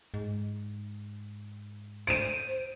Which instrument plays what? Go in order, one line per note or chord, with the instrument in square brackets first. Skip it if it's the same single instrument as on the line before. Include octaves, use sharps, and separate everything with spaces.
[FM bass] G#2
[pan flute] C5 [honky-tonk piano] D7 D#7